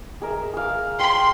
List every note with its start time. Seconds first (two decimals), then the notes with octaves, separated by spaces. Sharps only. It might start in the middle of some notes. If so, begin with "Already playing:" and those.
0.22 G#4 A#4 E5
0.53 G#4 F5
1.00 G5 C6